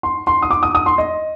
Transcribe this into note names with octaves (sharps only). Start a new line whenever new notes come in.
C6
C6
D#6
D6
D#6
D#6
C6
D#5